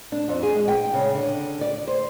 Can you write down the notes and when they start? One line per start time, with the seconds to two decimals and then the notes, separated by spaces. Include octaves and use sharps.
0.12 D4
0.28 F2
0.43 G#4
0.55 G#3
0.68 G5
0.94 C#3
1.15 D3
1.61 D5
1.88 C5